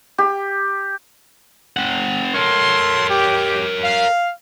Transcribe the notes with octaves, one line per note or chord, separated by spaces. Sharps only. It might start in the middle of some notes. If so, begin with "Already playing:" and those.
G4
C4 F#5
A4 A#4 C#5 C6
G4
F5